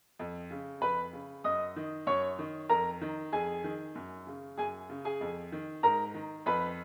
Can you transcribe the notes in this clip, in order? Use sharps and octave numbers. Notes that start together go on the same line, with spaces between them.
F2
C#3
F2 B4 B5
C#3
F#2 D#5 D#6
D#3
F#2 C#5 C#6
D#3
F2 A#4 A#5
D#3
F2 G#4 G#5
D#3
F#2
C#3
F#2 G#4 G#5
C#3
G#4 G#5
F2
D#3
G#2 A#4 A#5
D#3
F2 B4 B5